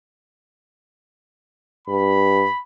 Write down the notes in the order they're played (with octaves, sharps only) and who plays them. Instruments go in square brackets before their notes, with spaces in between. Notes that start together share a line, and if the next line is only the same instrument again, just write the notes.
[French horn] G2 [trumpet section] B5